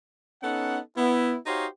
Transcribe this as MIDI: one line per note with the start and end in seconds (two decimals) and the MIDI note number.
0.43 0.78 59
0.43 0.78 61
0.43 0.78 63
0.43 0.78 69
0.43 0.78 78
0.97 1.36 59
0.97 1.36 64
1.46 1.66 63
1.46 1.66 66
1.46 1.66 67
1.46 1.66 72
1.46 1.66 73
1.46 1.66 77